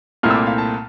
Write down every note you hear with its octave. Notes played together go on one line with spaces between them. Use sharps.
C2 A#2 A3 C4 E4 F6
E6
D6
F5
A5